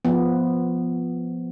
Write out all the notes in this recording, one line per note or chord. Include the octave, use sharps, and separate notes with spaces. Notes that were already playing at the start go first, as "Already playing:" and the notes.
F3 B3